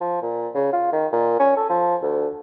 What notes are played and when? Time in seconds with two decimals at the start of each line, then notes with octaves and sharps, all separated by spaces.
0.01 F3
0.22 A#2
0.55 C#3
0.73 F4
0.93 D#3
1.13 A#2
1.40 C#4
1.57 A4
1.70 F3
2.03 D2